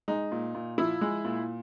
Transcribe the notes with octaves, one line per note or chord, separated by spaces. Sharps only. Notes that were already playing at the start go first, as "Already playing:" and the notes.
G#3 D#4
A#2
A#2
F3 E4
G#3
A#2